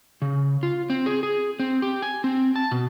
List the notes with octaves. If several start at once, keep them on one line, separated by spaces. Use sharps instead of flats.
C#3
F4
C4
G#4
G#4
C4
G4
G#5
C4
A5
B2